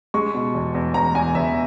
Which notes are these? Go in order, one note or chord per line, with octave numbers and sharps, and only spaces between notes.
G#3 C#6
B2
E2
E2
E2 A#5
E2 G#5
E2 E5